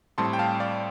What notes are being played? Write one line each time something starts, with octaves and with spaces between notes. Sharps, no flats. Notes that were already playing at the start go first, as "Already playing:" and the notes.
A2 G3 C4 A5 C6
G5
F5 A5
D5 F5